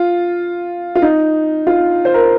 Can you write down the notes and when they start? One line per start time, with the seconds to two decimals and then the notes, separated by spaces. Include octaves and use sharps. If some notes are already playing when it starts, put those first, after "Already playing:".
Already playing: F4
0.95 F4
1.02 D#4
1.67 F4
2.05 C5
2.14 A#4